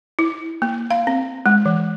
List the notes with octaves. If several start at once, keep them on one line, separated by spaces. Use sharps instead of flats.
E4
A#3
F5
C4
G#3
E3